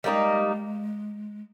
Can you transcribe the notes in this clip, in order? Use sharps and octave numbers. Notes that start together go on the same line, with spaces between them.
G3 G#3 A#3 D#4